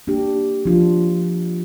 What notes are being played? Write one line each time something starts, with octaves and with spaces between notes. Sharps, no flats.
A#3 D4 G4
F3 D4 F4